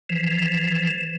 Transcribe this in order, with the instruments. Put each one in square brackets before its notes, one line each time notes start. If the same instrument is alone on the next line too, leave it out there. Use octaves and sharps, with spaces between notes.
[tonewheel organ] E3 F3